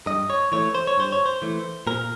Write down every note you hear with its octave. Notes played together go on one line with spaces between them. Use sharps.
G2 D#5
C#5
E3 A3 C#5
C5
C#5
G2 C5
C#5
C5
E3 A3
A#2 A#4